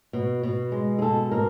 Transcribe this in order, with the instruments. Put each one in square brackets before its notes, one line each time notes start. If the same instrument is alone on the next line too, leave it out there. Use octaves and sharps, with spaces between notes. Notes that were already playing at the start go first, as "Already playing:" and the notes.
[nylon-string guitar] B2
B2
G#3
G#4
B2 A4
B2 A#4